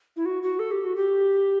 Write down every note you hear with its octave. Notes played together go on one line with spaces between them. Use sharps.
E4
F#4
F#4
A4
G4
F#4
G4